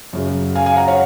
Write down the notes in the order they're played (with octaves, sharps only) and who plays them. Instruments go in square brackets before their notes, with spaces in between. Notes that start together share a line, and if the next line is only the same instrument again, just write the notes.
[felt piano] F#2 C#3 F#3
F5 G#5
F5 G#5
F#5 A#5
C#5 F5